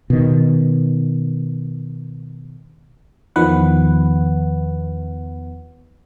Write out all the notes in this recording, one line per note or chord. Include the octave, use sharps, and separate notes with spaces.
B2 D#3
E2 D#3 F3 B3 B4 F#5